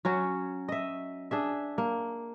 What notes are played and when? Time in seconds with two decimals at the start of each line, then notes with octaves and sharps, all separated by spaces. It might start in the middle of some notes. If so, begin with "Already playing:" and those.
0.05 F#3 C#4 F#4
0.68 D#5 E5
1.31 D4 G#4 E5
1.78 A#3